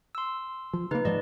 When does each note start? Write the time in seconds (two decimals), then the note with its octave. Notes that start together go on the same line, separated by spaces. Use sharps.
0.15 C6 E6
0.73 F3
0.91 C#3 A#3 D#4 B4
1.05 G#2 F3 D5 D#5